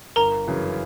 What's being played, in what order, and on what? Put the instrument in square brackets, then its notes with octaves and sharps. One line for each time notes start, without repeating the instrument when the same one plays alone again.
[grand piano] G1 [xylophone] A#4 A#5
[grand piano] F#2 C#3 E3